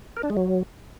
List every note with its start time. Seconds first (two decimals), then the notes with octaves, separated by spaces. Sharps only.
0.17 A#4
0.23 D4
0.30 G#3
0.37 F#3